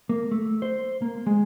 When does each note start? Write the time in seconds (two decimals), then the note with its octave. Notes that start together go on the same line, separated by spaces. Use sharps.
0.09 A#3
0.31 A3
0.62 C5
1.02 A#3
1.26 G#3